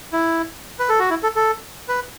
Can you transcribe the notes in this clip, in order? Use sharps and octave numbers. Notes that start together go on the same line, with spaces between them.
E4
B4
A4
F#4
E4
A4
A4
B4